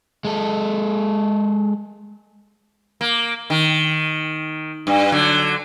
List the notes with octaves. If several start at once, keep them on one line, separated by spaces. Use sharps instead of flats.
G#3 A4
A#3
D#3
G2
D3 F#3